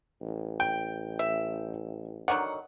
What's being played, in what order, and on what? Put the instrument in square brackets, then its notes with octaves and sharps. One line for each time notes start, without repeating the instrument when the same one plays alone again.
[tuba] A1
[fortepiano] G5
[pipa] E5
[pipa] D3 D#3 F#3 [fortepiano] F#5